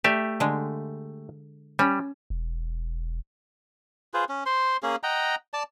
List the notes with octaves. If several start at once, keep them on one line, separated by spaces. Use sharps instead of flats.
A3 G4 D5 E5
D3 G#3
G3 C#4
E1
F4 G#4 B4 C5
C#4
C5 C6
A#3 C#4 G#4
D#5 F#5 G5 A#5
D5 A5